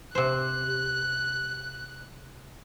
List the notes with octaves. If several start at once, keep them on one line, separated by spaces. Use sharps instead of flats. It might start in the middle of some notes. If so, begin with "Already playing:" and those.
C3 C5 F#6